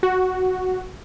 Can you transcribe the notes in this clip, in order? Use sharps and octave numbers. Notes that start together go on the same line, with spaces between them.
F#4